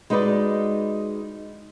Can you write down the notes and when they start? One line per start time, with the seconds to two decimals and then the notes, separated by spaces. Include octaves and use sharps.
0.10 G#3 D#4 F#4 B4 D5